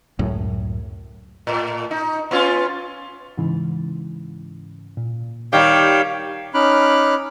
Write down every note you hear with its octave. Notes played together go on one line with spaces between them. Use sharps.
C#2 F#2 A2 F#3
A2
D#4
B3 C#4 F4
G#2 C#3 E3
A#2
D#3 G3 G4 C#5 F5
C#4 D#4 B5 D6 F6 F#6